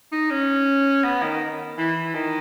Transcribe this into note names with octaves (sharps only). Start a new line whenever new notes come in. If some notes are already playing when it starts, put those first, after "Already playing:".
D#4
C#4
B3
D#3
E3
D#3